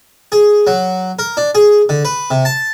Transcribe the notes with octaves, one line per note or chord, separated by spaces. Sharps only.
G#4
F#3
A#4
D4
G#4
D3
B4
C3
A5